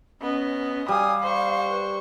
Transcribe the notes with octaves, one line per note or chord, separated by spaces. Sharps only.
B3 C#4 D#5
G3 F5 G#5 D#6
C5 C#6
B4